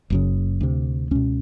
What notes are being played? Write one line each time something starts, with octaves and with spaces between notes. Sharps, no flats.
F#1 F#2 C#3
D2 C3
C#2 B2 C#4